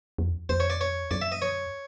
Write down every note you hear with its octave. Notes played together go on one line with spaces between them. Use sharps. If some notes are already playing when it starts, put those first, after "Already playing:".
F2
F2 C5
C#5
D5
C#5
F#2 D5
E5
D#5
C#5